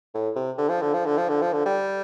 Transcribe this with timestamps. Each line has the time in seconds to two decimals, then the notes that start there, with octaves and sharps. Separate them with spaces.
0.14 A2
0.36 C3
0.58 D3
0.69 F3
0.82 D3
0.94 F3
1.06 D3
1.18 F3
1.29 D3
1.42 F3
1.53 D3
1.66 G3